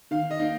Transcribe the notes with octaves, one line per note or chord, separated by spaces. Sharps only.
D#3 F5
D#5
A#3 D#4